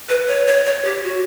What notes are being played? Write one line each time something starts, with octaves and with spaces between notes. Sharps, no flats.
B4
C#5
C#5
C#5
G4
F#4